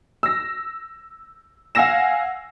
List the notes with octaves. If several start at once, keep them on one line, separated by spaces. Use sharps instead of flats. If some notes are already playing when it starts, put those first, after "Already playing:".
E6 A#6
F5 F#5 G#5 E6 A#6 E7